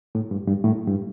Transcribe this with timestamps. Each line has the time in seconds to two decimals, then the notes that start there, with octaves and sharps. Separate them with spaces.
0.15 A2
0.31 G2
0.47 G2
0.64 A2
0.87 G2